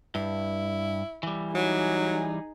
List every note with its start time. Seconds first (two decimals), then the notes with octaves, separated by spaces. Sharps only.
0.15 G2 E4
1.23 E3 G3
1.55 F#3 D#4 G#4